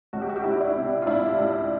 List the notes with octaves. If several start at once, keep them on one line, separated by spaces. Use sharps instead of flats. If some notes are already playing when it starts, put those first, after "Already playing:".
C#2 F#4
G4
F#4
G4
C#2 E4 F#4
D4 E4
C3
F4
C#2 D4 E4
C#2